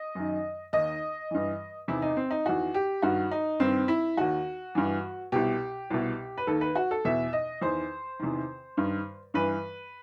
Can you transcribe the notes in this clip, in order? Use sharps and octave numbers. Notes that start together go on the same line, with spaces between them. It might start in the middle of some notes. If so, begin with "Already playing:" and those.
Already playing: D#5
F#2 D#3
D#2 D#3 D#5
G2 E3
E2 C3 D#3 E4
D#4
C4
D#4
E2 D#3 F#4
G4
G2 D#3 F#4
D#4
G2 D#3 C4
E4
D#2 D#3 F#4
G2 E3
C2 B2 G4
C2 B2
B4
D#2 D#3 A4
B4
F#4
A4
E2 B2 E5
D#5
E2 D#3 C5
E2 C3 D#3
G2 D#3
G2 E3 B4